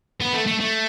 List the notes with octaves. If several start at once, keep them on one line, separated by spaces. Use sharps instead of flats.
B3
A3
A3
A3